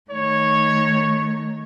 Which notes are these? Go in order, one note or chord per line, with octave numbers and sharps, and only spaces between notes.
D#3 A3 C#5